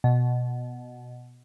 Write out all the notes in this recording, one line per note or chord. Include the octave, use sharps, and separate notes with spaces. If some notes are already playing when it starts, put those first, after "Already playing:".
B2